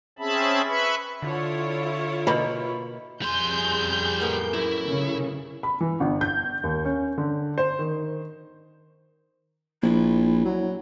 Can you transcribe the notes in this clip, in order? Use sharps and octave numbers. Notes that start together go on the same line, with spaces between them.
C4 C#4 G#4 E5 A5 B5
B4 E5 B5 C#6
D3 E4 F4 C#5
B2 A#3 B5
F2 G3 G#4 C6 G6
A2 A#3 B3
F#2 E4
C#3
B5
E3
G1
G6
D#2
C#4
D3
C5
D#3
A#1 E4
F#3